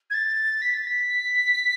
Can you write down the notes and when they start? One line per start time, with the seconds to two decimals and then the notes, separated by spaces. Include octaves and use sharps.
0.10 G#6
0.14 A6
0.62 B6
0.74 A6
0.87 B6